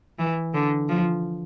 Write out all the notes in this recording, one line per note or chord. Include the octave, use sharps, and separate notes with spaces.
E3
D3
F3